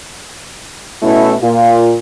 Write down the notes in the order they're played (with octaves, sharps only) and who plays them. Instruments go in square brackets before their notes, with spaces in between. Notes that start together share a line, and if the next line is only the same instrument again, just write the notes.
[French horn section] B2 A3 C#4 E4
A#2 F4